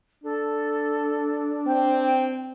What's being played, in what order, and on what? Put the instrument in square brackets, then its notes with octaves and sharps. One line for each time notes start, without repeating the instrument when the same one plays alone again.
[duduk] D4 [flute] A4
[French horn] C4 [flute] G5